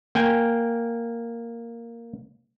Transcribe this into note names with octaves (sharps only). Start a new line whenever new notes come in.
A#3 G5 G#5